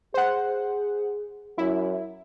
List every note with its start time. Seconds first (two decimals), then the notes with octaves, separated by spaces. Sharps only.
0.14 G#4 C5 F#5
1.58 F#2 E4